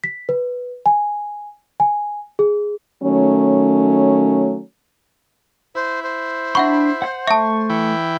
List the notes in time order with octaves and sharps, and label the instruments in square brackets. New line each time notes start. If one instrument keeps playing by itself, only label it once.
[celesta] B6
B4
G#5
G#5
G#4
[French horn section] D#3 F#3 A3 C#4
[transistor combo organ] E4 [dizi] C5
[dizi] C5
[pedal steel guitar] D4 B5 [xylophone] E5 F#5 C#6
[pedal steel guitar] F#5 G6
[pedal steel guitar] A3 C#6 [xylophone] E5 A5
[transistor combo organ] E3 E4 G5